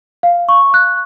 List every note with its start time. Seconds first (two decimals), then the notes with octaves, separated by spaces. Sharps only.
0.23 F5
0.49 C#6
0.74 F#6